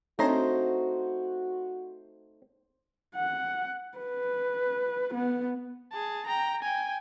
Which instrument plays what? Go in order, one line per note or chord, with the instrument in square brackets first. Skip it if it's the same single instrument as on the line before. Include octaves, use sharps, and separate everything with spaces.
[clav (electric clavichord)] A3 D#4 A#5 [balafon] C4 D4 C#5 [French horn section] F#4 [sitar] C5
[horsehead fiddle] F#5
B4
B3
[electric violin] G#4 A5
G5 A#5
G5 G#5